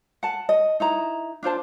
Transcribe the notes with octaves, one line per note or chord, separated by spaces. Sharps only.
F#5 A5
D#5
D#4 E4 A#5
D4 F4 C5 A5